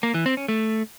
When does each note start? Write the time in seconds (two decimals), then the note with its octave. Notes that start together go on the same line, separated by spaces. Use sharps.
0.03 A#3
0.14 E3
0.26 C4
0.37 C#4
0.48 A3